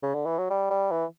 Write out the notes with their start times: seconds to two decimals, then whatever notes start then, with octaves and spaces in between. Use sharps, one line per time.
0.03 C#3
0.14 D3
0.26 E3
0.38 F#3
0.50 G3
0.70 G3
0.91 E3